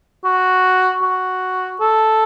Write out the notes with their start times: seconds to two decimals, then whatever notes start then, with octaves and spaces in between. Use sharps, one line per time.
0.25 F#4
1.02 F#4
1.80 A4